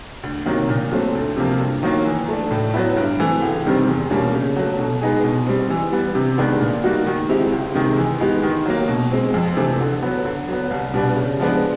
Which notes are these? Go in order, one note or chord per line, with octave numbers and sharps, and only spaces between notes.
D2
C3 D#3 F#3 A#3
A#2
F#3 A3 C4
D2
C3 F3 A#3
G2
D#3 F#3 A#3
E3
A3 D4
A2
F#3 B3 E4
G2
E3 A3 C4
C#2
C3 D#3 G3 C4
E2
B2 G3 A#3 C#4
C#3
F#3 A3
B2
G#3 B3 D#4 G#4
B2
G3 C4
E3
G3 B3
C3
D#3 G#3 B3 D4
A#2
G3 A#3 D#4 F#4
D#3
G#3 C4 E4 G4
C#2
C3 D#3 G#3
E3
G#3 B3 D#4 G4
D#3
F#3 A#3
B2
G#3 C4
F2
C3 E3 A3 C4
D3
F#3 B3
D3
F#3 B3
C2
B2 G3 B3 D4
C#3
F3 G#3 B3 D4